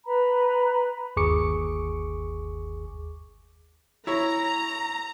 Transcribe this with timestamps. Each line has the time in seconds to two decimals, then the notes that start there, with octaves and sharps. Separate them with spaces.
0.05 B4 A#5 B5
1.17 G1 D#2 G#4 C#6 D6 C#7
4.07 E4 C#5 A#5